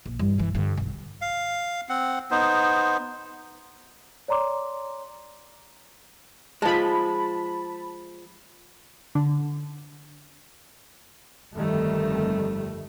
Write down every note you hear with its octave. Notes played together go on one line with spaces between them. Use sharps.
A#1
G2 E3
B1 E3
G2 D3
B1
F5
C4 F#5
B3 D#4 C5
C#5 D5 A#5 C6 D6
F3 G#3 A5 B5
D3
G1 F2 D#3 G3 A3